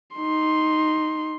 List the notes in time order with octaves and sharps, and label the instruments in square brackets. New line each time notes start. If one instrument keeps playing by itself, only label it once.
[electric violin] D#4 C6